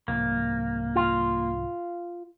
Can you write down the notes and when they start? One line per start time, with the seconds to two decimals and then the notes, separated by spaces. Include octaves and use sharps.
0.08 C2 G#2 F3 A#3
0.96 F4